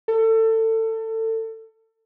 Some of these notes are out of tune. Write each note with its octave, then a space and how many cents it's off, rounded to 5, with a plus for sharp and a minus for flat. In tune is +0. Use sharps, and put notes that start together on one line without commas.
A4 +25